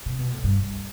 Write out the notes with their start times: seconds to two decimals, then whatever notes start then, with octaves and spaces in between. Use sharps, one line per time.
0.06 C3
0.19 B2
0.31 A2
0.44 G2